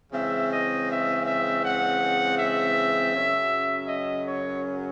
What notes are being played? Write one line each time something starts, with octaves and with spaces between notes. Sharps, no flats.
C#3 E3 G#3 C4 E5
D#5
E5
E5
F#5
E5
F#2 C#3 F#3 C#4
D#5
C#5